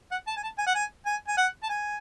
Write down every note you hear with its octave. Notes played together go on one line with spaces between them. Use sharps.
F#5
A5
G#5
A5
G#5
F#5
G#5
G#5
G#5
F#5
A5
G#5